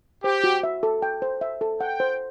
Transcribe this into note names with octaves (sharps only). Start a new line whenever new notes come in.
G4 C5
F#4
E5
A4
G5
C5
E5
A4
F#5 G5
C5